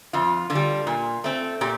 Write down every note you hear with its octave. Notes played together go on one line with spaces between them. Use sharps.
F2 F4
D3 F4
G3
A#2
A3 C4
A#2 G4